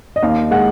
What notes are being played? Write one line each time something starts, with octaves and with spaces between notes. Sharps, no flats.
D#5
D#2 F5
G#3 F#5